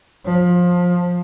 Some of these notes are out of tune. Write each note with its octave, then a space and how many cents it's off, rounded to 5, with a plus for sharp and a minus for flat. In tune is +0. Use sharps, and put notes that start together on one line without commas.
F3 +20